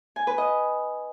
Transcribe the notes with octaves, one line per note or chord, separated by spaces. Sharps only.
G#5
B4
D#5